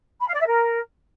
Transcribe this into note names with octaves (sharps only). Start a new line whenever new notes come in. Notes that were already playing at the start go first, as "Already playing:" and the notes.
B5
F5
D5
E5
A#4